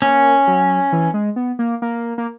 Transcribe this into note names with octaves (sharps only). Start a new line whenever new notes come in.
A#3 C#4
F#3
E3
G#3
B3
A#3
A#3
A#3